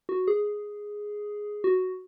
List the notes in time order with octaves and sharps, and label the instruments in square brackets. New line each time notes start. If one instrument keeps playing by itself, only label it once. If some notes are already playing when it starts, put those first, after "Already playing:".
[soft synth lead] F#4
G#4
F#4